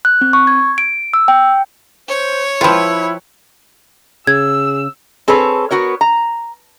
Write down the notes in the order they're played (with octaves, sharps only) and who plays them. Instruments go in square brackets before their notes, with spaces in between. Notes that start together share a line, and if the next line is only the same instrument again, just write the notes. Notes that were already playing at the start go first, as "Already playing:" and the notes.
[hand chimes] F#6
C4
C#6
G#6
D7
E6
G5
[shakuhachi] C5 [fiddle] C#5
[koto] F3 F4 [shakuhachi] E4 [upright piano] B4 G5 B5
[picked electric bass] C#3 [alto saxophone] G#4 [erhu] E6 [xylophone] G#6
[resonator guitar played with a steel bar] C4 G#4 A4 B4 C#5
B3 F#4 A#4 C#5
A#5